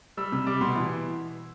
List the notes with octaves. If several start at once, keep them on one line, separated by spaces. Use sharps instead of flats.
G3 E6
C3 E6
G3 D6
B2 C6
E3